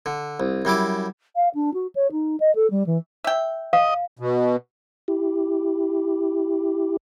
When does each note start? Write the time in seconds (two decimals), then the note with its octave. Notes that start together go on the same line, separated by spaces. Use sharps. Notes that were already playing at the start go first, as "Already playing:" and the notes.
0.06 D3
0.40 C2
0.65 F#2 G3 E4 D6
1.36 F5
1.54 D4
1.74 F#4
1.95 C#5
2.11 D#4
2.40 D#5
2.55 A4
2.70 G3
2.86 E3
3.24 E5 G5
3.73 D#5 F5
4.19 B2
5.08 E4 G4